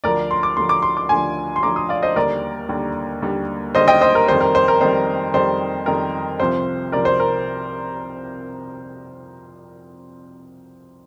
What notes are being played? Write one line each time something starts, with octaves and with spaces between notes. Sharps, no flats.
D2 D3 F3 A#4 D5
C6
D6
D2 D3 F3 C6
D6
C6
D6
D2 D3 F3 G#5 C6
C6
D2 D3 F3 A#5 D6
C6 D#6
D5 F5
C5 D#5
D#2 D3 G3 A#4 D5
D#2 D3 G3
D#2 D3 G3
D#2 D3 G3 C5 D#5
D#5 G5
C5 D#5
A#4
F2 D#3 G3 C5
A#4
C5
A#4
F2 D#3 G3 C5
F2 D#3 G3 C5
F2 D#3 G3 A#4
C2 C3 F3 C5
C2 C3 F3 A#4 D5
C5
A#4